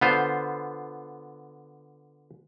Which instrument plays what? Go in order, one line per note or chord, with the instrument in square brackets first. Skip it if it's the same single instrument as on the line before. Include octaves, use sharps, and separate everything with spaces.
[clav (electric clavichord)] D3 B3 F4 C5